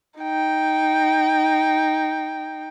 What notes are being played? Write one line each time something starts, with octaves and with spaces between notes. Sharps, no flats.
D#4 G5